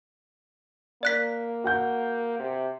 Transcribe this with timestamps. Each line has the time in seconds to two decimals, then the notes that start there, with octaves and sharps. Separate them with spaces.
1.03 A#3 D5 F#6 B6
1.64 F#4 F#5 G6
2.39 C3